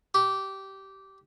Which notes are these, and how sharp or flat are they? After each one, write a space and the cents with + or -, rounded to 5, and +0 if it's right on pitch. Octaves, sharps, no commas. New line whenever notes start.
G4 -15